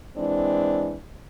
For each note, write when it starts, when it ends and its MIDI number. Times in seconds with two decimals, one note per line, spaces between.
0.17 0.96 52
0.17 0.96 56
0.17 0.96 60
0.17 0.96 62